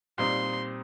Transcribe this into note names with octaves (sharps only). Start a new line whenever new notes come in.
A#2 G3 C4 D#4 C6